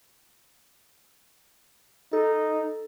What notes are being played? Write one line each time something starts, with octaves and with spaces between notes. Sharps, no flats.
D#4 A4